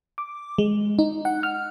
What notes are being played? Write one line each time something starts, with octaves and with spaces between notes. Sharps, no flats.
D6
G#3
D#4
F#5
F6